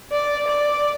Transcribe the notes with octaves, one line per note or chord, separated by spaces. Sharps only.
D5
D5